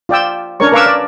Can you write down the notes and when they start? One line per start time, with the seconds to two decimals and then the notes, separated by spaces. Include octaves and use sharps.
0.09 F4 D5 G5 E6
0.60 C#4 D4 A#4 C#5 C#6
0.72 A#4 B4 F5 C#6 D6 E6
0.86 D5